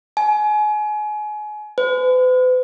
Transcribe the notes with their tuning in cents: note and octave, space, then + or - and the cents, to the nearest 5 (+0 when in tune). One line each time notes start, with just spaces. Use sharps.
G#5 +30
B4 +45